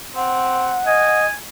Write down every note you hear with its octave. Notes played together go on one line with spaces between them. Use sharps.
C4 F#5
D#5 G#5